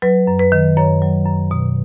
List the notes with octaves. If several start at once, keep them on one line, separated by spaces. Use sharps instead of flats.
F#3 B4
F#2
B4
D#3
F#2 C#5
F#3
F#2
B2